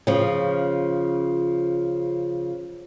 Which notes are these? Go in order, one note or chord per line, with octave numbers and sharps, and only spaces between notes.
C#3 F3